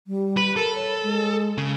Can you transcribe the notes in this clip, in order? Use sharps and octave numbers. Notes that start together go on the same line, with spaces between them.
G3
B4
A4 A#4
C#5
G#3
C#3